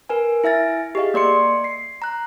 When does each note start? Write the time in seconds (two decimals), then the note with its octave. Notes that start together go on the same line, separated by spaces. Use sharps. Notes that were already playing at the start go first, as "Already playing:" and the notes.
0.09 A#4 B4 G#5
0.44 E4 E5 G#5 A6
0.95 G4 G#4 D#5 F5
1.14 A#3 D5 C6 C#7
1.64 C7
2.02 A#5 F#6